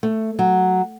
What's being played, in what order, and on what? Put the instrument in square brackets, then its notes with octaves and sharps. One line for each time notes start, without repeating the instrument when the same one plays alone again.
[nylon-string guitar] A3
F#3